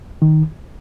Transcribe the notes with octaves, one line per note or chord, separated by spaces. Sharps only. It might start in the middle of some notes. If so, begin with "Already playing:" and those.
D#3